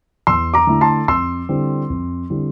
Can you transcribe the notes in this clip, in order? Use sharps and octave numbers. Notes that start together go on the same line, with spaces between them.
E2 C6 E6
A#5 D6
D3 A3 E4
A5 C6
F2 C6 E6
D3 G3 C4 E4
F2
D3 G3 C4 E4